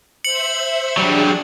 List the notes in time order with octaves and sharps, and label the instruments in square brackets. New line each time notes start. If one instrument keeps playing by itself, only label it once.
[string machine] C5 E5 [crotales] C#7 F#7
[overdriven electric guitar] F#3 G3 [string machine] D4 G#4